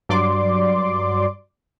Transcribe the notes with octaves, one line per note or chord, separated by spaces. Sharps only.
G2 F#3 D5 C6 D6